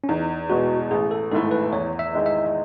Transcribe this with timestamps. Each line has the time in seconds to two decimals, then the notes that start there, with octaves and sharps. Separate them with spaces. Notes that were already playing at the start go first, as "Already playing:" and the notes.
0.04 C#4
0.09 E2 D#4
0.50 B2 G#3 F#4
0.91 A1 G#4
1.11 A4
1.31 G#2 D#3 A3 E4 A4
1.51 B4
1.72 E2 C#5
1.99 E5
2.13 D#3 G#3 D#4
2.26 E5